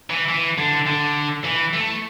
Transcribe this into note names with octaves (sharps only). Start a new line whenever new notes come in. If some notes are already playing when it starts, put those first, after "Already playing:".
E3
E3
D3
D3
E3
A3